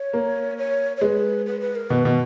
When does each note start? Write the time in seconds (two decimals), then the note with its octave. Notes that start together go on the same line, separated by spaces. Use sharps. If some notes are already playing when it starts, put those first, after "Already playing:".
Already playing: C#5
0.13 A#3
0.58 C#5
0.97 C#5
1.01 G#3 B4
1.46 B4
1.61 B4
1.75 A#4
1.90 B2 B4
2.05 B2